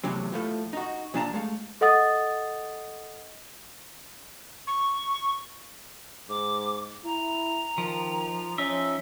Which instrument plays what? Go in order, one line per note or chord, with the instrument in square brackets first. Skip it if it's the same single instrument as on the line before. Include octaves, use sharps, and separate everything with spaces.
[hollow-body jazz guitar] E2 A2 C3 F#3 C4
A2 F3 A3
D#4 F#4
A#2 F3 D4 F#4 A5 A#5
G#3 A3 F5
[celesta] A4 D#5 F#5 D#6 A6
[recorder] C#6
[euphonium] G#2 [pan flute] D6
[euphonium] E4 [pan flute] A#5
[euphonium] D#3 [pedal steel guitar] F3
[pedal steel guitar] F3 D#4 E5 [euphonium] C#4